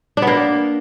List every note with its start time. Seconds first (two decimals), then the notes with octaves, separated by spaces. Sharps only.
0.17 D4
0.22 B3
0.27 A#3